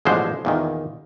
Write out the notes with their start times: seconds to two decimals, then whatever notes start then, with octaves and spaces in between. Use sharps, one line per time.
0.05 A1 B2 D3 F3 G#3 C5
0.45 E2 A#2 D#3